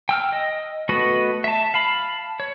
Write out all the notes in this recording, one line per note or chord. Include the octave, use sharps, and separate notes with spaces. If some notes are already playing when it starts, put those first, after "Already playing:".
G5 E6 F6
D#5
A3 B3 F#4 B4 D#5
E5 A5
F5 A5 B5
C#5